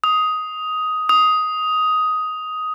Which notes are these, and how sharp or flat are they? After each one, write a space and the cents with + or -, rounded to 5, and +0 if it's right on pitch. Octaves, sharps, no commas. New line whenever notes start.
D#6 +10
D#6 +10